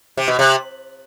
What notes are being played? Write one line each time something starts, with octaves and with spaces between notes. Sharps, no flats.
C3
B2
C3